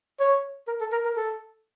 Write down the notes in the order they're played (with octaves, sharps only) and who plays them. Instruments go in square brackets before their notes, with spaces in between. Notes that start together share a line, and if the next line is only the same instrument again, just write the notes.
[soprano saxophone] C#5
A#4
A4
A#4
A#4
A4